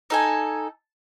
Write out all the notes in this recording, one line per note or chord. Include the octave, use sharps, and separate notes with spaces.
D#4 A4 G#5